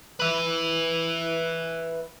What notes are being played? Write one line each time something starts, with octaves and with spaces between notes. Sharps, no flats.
B4 E5